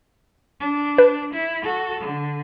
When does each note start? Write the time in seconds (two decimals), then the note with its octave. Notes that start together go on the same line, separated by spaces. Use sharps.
0.60 D4
0.98 B4
1.34 E4
1.63 F#4 A4
2.01 D3